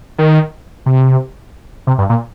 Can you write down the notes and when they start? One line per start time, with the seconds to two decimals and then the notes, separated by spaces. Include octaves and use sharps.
0.18 D#3
0.86 C3
1.87 C3
1.98 G2
2.09 A#2